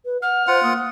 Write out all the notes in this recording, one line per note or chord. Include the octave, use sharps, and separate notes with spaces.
B4
F#5 F6
F4 C5 F#5
A#3 D#6